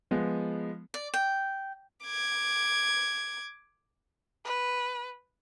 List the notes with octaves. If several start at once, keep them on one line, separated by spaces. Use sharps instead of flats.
F3 G#3 B3
D5
G5
D6 G#6
B4